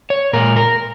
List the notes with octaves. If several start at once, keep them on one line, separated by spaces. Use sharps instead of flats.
C#5
A#2 G#3 A#4
A#4